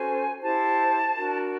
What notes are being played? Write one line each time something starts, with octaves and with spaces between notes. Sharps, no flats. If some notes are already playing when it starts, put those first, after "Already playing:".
Already playing: C#4 F#4 A4 C5 G#5
E4 G4 C5 A5
D4 F#4 A#4